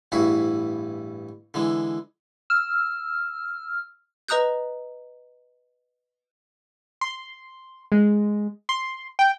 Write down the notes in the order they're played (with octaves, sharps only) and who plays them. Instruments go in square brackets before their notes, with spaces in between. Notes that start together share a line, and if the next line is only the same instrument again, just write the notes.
[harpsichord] A1 G2 E4 F#4 G#4
D3 E3 G#3
[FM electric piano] E6 [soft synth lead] F6
[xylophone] B4 D#5 A#5 D#6 F#6 G6
[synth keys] C6
G#3
C6
G5